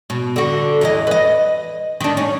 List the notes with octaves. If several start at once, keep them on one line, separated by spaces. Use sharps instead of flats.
B2
D3 F#4
E2 E3 D#5
B4 D#5
D#3 D4
C#4